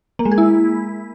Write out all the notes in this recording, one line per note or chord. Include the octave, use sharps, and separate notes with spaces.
A#3
G#3
G#4
E4